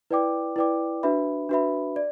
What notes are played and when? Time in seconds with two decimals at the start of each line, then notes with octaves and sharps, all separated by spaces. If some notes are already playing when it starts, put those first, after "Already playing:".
0.10 E4 B4 D5 G5 D6
0.56 E4 B4 D5 G5 D6
1.03 D4 F#4 B4 E5 B5
1.49 D4 F#4 B4 E5 B5
1.96 D5